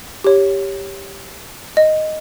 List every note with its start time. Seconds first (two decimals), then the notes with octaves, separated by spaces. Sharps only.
0.24 G4 C#5
1.77 D#5